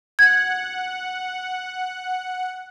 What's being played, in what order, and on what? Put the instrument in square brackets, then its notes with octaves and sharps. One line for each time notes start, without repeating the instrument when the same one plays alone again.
[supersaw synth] F#5 [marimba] G#6